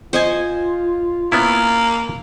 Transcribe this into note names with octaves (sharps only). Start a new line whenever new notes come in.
F4 C5 D#5 G#5
A#3 B3 C#4 E4